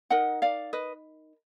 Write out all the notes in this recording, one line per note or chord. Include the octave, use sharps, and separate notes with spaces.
D#4 A#4 D#5 F#5
D5 F5
B4 D#5